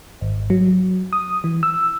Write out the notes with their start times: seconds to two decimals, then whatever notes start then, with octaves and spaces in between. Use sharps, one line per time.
0.21 G#1
0.50 F#3
1.13 D#6
1.44 E3
1.63 E6